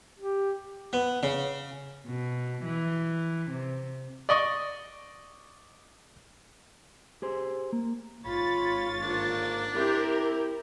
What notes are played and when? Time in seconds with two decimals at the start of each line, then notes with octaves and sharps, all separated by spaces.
0.20 G4
0.93 B3
1.23 C#3
2.06 B2
2.64 E3
3.51 C3
4.29 D5 D#5 C#6
7.22 G4 G#4 C5
7.73 A#3
8.25 G#1 F4 C#5 B5 A6
9.02 G#2 D3 A#3 D4
9.75 C4 E4 G4 A#4